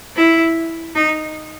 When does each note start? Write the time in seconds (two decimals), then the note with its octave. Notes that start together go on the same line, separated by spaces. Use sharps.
0.16 E4
0.95 D#4